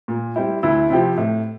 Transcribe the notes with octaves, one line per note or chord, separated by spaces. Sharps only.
A#2
G3 C4 E4
D2 E4
C3 F3 C4 G4
A2